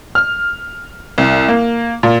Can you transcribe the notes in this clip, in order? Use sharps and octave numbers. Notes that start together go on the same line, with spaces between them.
F6
C2
A#3
A#2